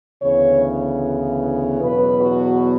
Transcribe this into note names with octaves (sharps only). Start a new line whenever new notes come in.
D2 C#3 E3 B3 C#5
E2 B2 F#3 B3 B4
F#4